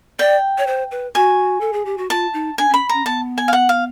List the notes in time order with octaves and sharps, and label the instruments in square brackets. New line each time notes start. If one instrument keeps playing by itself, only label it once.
[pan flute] D5 [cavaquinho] G5
[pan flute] C#5
C5
B4
[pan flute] F#4 [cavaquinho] G#5
[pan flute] A4
G#4
G4
F#4
[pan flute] F4 [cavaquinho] A5
[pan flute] D#4
[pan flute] D4 [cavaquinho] G#5
[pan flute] C#4
[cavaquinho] B5
[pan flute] C#4 [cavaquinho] A#5
[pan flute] B3 [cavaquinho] A5
[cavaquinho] G#5
F5
F#5
F5